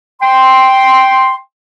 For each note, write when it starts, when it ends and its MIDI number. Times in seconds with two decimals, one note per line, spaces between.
0.22 1.36 79
0.22 1.36 84